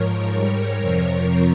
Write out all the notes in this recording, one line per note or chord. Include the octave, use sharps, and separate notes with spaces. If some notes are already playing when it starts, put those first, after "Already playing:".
Already playing: G#2 F3 A#4 C#5
G#2 G3 A#4 C#5
F2 C3 F3 A#4 C#5